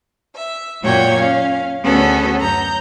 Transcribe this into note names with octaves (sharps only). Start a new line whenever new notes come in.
E5
F#2 A#2 F#4 C#5 G5 G#6
C#4 F5
D2 B3 C#4 F#4 G#4 A4
F#2 A#5 G6